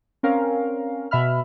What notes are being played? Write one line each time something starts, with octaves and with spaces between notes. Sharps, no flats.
C4 C#4 A#4 F5
B2 E5 B5 F6